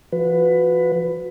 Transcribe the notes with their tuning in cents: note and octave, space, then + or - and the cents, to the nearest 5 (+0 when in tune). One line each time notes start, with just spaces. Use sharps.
F3 -35 F#4 -20 B4 +15